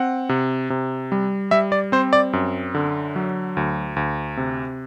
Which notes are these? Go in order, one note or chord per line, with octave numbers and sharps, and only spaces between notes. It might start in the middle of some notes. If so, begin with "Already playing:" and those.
Already playing: C4 F#5
C3
C3
G3
G3 E5
D5
C4 C5
D5
F#2
D3
F#3
D2
D2
C3